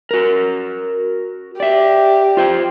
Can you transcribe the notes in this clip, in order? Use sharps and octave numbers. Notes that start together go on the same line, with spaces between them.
F#4 A#4
G4 D5 E5
F4 C5 G5